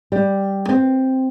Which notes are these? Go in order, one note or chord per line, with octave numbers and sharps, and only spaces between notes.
G3
C4